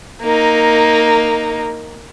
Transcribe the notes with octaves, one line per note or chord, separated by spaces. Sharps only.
A#3 D#4